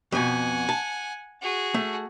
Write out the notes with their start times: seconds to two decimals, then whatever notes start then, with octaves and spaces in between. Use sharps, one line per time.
0.12 F2 B2 F#5 G#5
0.69 A5
1.42 F#4 G#4
1.74 A3